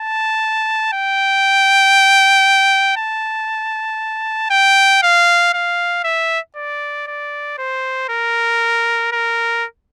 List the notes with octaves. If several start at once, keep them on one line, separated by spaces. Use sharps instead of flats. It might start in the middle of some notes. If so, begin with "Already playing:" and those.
Already playing: A5
G5
A5
G5
F5
F5
E5
D5
D5
C5
A#4
A#4